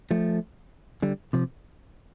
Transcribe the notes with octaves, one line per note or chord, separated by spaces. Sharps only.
F3 A3
D3 G3
C3 F3